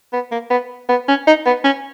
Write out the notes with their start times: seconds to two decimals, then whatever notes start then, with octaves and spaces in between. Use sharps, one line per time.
0.13 B3
0.31 A#3
0.50 B3
0.89 B3
1.08 C#4
1.27 D#4
1.46 B3
1.64 C#4